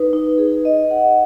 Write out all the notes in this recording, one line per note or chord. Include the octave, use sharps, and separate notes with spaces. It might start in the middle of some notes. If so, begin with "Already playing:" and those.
Already playing: D#4 B4
D#4
G#4
D#5
F#5